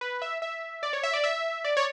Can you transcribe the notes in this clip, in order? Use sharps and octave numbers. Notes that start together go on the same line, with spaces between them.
B4
E5
E5
D5
C#5
E5
D5
E5
D5
C#5